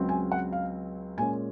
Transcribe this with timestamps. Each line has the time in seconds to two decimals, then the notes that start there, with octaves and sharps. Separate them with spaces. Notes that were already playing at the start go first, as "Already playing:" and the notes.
Already playing: C#2 C#3 F#3 C4
0.09 G#5
0.32 F#5
0.53 F5
1.17 A#2 G#3 C#4 G#5